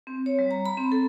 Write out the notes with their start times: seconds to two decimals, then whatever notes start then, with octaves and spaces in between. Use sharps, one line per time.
0.07 C4
0.26 C#5
0.39 G3
0.51 A#5
0.65 B5
0.77 C4
0.92 A4